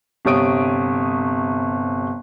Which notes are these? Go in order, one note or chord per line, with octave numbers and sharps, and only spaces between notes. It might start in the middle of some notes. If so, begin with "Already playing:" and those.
G1 C3 G3 C#5 D#6 D7